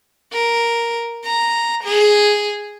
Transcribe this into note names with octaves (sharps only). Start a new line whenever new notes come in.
A#4
A#5
G#4